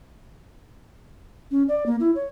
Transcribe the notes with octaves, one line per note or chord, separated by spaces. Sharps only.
C#4
D5
A#3
E4
C#5